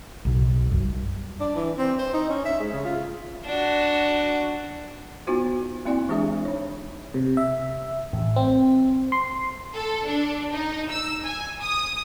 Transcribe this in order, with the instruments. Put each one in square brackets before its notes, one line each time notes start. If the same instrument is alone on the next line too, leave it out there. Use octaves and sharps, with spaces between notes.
[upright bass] B1
F#2
G3
[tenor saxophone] D4
E3
C4
C5
D#4
C#4
E5
G#3
C#3
F4
[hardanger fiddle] D4 F#4
[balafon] B3 D#4 F4 F#4 C5
A#3 C4 E4 D5 G5 G#5
E3 G#3 D4 G4 G#4 E5
D#4 C#5
[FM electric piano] C3
E5
A1
C4
C6
[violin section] A4
D4
D#4
E6
G#5
D#6